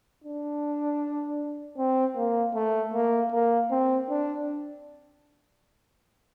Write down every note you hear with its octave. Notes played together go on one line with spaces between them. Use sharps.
D4
C4
A#3
A3
A#3
A#3
C4
D4